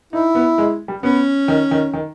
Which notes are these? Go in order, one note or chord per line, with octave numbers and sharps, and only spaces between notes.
D#4 E4
B3
G#3
G3
B3 C#4
D#3
D#3
D#3